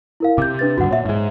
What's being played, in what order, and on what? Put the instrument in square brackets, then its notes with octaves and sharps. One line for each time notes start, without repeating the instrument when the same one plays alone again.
[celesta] E4 A#4 F5
[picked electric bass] C3 [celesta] D6 G6
[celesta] D4 B4 A6
[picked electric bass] D#1 G2 D3 [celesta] F#4 F#5
[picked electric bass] A#2 [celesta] C#5 E5
[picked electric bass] G#2 G#3